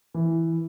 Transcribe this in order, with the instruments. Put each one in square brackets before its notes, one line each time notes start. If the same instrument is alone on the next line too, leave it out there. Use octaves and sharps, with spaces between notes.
[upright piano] E3